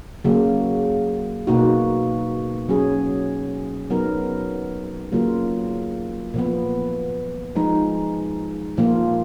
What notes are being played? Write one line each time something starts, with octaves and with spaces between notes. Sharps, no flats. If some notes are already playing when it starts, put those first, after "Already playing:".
C#3 F#3 A#3
B2 A#3 D#4 F#4
F#3 C#4 G#4
F#3 B3 D#4 A#4
C#3 F#3 A#3 F4 A#4
A#2 F3 B3
F3 G#3 D#4
A#2 F3 A#3 F4